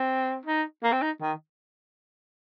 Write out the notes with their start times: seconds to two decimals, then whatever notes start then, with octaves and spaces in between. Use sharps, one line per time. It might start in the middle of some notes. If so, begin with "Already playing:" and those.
Already playing: C4
0.45 D#4
0.84 A#3
0.92 C4
1.02 D#4
1.21 D#3